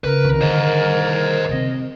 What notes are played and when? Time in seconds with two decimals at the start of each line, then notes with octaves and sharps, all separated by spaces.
0.04 C#3 A#4 B4
0.25 C2 D#3
0.41 D3 G3 C5 D#5
1.49 C3 C4 D#5